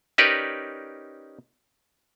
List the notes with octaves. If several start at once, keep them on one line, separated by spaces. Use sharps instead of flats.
C#4 D#4 G4 A#4 B4 D5